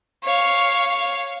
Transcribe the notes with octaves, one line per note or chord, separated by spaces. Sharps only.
C#5 F5